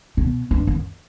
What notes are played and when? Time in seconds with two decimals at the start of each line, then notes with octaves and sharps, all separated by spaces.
0.17 B2
0.51 G2
0.67 F#2